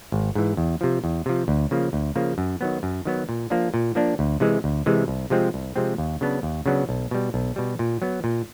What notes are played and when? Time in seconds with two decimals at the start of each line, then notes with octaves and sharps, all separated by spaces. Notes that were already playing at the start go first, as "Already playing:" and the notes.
0.12 G#1
0.35 G#2 E3
0.57 E2
0.81 C3 F3
1.04 E2
1.26 C3 F3
1.48 D2
1.71 C#3 F3 A#3
1.93 D2
2.16 C#3 F3 A#3
2.38 F#2
2.61 D#3 F#3 B3
2.83 F#2
3.05 D#3 F#3 B3
3.29 A#2
3.50 F3 A#3 D4
3.74 A#2
3.95 F3 A#3 D4
4.19 D2
4.40 C3 E3 G#3
4.64 D2
4.86 C3 E3 G#3
5.08 C2
5.30 C3 F3 G#3 C4
5.54 C2
5.76 C3 F3 G#3 C4
5.98 D#2
6.21 C#3 F#3 B3 D4
6.43 D#2
6.66 C#3 F#3 B3 D4
6.89 B1
7.11 B2 G3
7.34 B1
7.56 B2 G3
7.79 A#2
8.02 F#3 B3
8.24 A#2